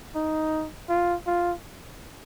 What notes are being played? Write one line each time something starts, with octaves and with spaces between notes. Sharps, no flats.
D#4
F4
F4